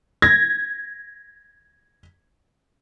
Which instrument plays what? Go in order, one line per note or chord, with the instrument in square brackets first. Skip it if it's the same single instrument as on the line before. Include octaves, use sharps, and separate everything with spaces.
[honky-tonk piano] G#6 A#6